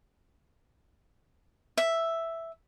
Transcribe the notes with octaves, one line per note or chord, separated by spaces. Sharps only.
E5